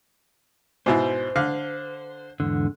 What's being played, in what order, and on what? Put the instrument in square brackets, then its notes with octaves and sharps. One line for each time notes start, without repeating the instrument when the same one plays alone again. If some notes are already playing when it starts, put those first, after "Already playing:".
[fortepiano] G#2 B2 E4 [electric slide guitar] C5
[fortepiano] D3 F5
[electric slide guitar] E2 G#2 D3